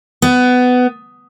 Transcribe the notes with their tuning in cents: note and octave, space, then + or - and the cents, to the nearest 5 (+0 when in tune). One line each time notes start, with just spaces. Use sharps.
B3 +15